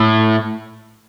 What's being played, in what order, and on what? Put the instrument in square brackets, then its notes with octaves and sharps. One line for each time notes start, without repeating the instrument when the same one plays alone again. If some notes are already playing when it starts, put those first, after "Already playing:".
Already playing: [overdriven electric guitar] A2